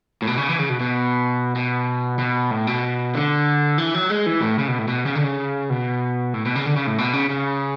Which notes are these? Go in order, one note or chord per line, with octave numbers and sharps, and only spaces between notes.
A2
B2
C#3
E3
C#3
B2
B2
B2
B2
A2
B2
D3
E3
F#3
G#3
E3
A2
C#3
B2
A2
B2
C#3
D3
C#3
B2
A2
B2
C#3
D3
C#3
A2
B2
C#3
C#3